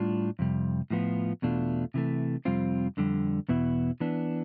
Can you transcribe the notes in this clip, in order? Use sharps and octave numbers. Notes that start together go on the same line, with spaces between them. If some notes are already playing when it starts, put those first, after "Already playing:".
Already playing: A2 G3 D4 F4
F2 C3 G3
A2 F3 B3 F4
E2 B2 A3 D4 F4
C3 E3 A3
F2 C3 G3 C4 F4
F2 D3 G3
E2 B2 B3 E4
E3 B3 D4